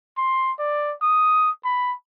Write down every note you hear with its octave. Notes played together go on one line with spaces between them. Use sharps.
C6
D5
D#6
B5